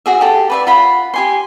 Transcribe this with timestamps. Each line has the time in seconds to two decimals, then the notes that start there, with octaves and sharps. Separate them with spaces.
0.06 F#4 G#4 E5
0.21 G4 A4
0.50 B4 D5 E5
0.67 F4 F#5 B5
1.14 G4 G#5 C6